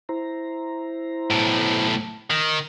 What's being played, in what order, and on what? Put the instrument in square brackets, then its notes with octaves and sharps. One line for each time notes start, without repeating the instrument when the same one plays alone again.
[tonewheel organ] E4 C5 A#5
[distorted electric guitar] B1 A2
D#3